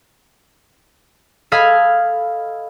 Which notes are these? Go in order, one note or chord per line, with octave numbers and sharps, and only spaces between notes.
A4 D#5 F5 B5 F6 G#6